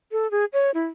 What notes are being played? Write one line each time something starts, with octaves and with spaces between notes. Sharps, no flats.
A4
G#4
C#5
E4